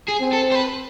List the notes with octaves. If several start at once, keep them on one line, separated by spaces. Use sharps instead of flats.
G#4
C4
A4
C5
B4